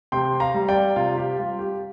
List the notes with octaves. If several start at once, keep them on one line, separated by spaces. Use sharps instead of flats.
C3 G5 C6
F5 A#5
G3
D5 G5
C3 F4
G4
G3 F4
G4